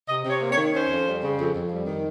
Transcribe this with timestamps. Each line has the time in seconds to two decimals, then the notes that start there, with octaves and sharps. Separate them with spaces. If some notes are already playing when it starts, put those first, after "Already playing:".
0.09 C3 D#5
0.25 C3 C#5
0.41 A#3
0.51 C#5
0.57 D#3
0.73 C#4 C5
0.90 F2
1.07 G3
1.22 C#3
1.39 F2
1.55 F2
1.72 G3
1.87 D#3